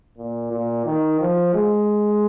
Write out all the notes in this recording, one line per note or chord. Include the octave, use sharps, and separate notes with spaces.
A#2
A#2
D#3
F3
G#3